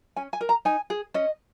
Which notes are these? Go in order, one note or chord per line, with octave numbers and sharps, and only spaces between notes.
C#4 G#5
G#5
A#4
A#5
D#4 G#5
G#4
C#4 D#5